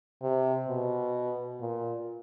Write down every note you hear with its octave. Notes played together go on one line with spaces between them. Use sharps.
C3
B2
A#2